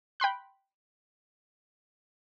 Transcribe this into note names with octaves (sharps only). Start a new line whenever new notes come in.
G5 B5 C6 F#6